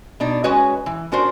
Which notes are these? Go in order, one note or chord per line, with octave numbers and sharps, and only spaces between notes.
B2 D4 D#4
G#3 C#4 F#4 B4 C#5 D#5
E3
C#4 D4 F#4 A#4 C5